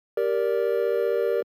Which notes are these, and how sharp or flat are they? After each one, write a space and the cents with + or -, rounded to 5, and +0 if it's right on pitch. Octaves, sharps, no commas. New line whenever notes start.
G4 +0 A#4 +5 D5 -15